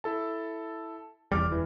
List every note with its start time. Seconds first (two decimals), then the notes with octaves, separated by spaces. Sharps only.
0.04 E4 A4 A5
1.32 F1 E2 G3 D6 F6
1.52 E3